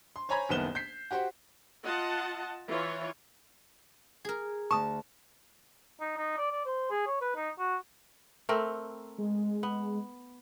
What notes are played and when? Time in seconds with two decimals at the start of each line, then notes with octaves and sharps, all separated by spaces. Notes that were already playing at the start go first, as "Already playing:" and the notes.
0.16 C6
0.29 C5 C#5 G#5 A#5 B5 G#6
0.49 F#1 C2 D#3 B3 E7 G7
0.75 G6 B6 C7
1.11 F#4 G4 C5 F#5
1.84 F4 D#5 F#5 A5
2.68 E3 F4 C#5
4.25 G#4 A#4
4.71 D2 A5 C#6 D#6
6.00 D#4
6.17 D#4
6.38 D5
6.51 D5
6.65 C5
6.90 G#4
7.07 C#5
7.21 B4
7.36 D#4
7.58 F#4
8.49 A3 C4 A#4
9.19 G#3
9.63 B3